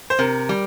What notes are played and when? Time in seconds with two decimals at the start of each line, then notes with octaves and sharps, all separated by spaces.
0.10 C5
0.19 C3 A#4
0.49 G3